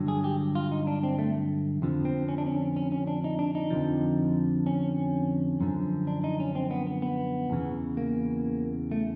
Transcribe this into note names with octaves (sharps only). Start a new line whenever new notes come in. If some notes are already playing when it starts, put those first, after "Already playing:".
Already playing: G2 D3 F#3
G#4
G4
F4
D#4
D4
C4
A3
F2 D3 F3
C4
C#4
D4
C#4
C#4
C#4
D4
D#4
D4
D#4
F2 D3 F3
C#4
F#2 D3 F3
D4
D#4
C#4
C4
B3
B3
B3
E2 C#3 E3
A#3
A3